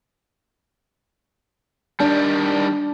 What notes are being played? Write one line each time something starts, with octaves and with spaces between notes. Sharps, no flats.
D#3 G3 D4 D5